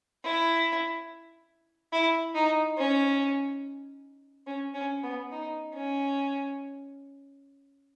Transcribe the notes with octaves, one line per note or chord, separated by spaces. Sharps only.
E4
E4
D#4
C#4
C#4
C#4
B3
D#4
C#4